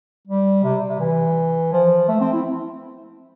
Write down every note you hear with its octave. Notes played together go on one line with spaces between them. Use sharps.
G3
C3
C3
E3
F3
A3
C4
E4